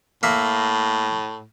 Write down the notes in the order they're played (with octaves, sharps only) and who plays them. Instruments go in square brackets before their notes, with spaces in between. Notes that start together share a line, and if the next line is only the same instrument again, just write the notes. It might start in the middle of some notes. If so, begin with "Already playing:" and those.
[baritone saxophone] A2 [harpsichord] A#3 E5